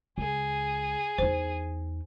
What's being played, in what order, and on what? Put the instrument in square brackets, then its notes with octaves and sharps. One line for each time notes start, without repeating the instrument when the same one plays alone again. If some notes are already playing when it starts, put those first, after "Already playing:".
[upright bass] C#2 [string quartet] G#4
[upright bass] E2 D#4 [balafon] C5